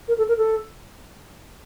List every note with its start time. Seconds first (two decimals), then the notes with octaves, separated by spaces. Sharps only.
0.08 A#4
0.18 A4
0.28 A#4
0.38 A4